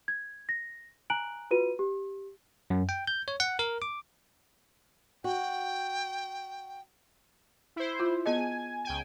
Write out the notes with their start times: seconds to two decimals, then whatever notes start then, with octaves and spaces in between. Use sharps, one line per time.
0.08 G#6
0.49 A#6
1.10 G#5 A#5 F#6 D7 F#7
1.51 F4 F#4 B4 D#7
1.79 G4
2.70 F#2
2.89 G5
3.07 G6
3.28 C#5
3.40 F#5
3.59 A#4
3.82 D6
5.24 F#4 G5
7.76 E4 C5
8.00 F4
8.26 B3 G#4 D#5 G#5
8.85 C#2 G5 G#5